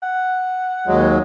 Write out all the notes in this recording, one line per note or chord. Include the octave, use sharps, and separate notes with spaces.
F#5
D#2 F#3 G#3